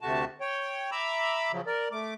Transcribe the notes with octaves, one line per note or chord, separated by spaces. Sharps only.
D2 C3 A3 F#4 A5
C#5 G5
E5 A#5 B5 D6 E6
C#3 F3 F#3
A#4 D5
A3 D6